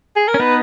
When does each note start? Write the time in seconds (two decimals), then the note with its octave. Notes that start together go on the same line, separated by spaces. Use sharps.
0.16 G#4
0.28 A#4
0.34 C#4
0.40 B3 D#4 B4